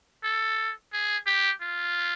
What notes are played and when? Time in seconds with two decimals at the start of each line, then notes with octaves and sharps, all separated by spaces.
0.23 A4
0.93 G#4
1.26 G4
1.61 F4